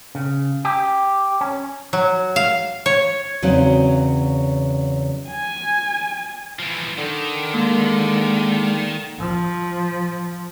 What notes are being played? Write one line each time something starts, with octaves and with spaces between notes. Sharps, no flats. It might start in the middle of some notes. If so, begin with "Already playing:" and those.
C#3
G4
C#4
F#3
F5
C#5
E2 C#3 F#3 C4 D#4
G#5
E3 F3
D3 D#3
G#3 A#3
F3